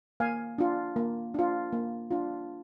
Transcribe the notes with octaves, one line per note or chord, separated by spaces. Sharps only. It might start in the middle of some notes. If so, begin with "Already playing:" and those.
A#3 F5 G#5
D4 F4
A#3
D4 F4
A#3
D4 F4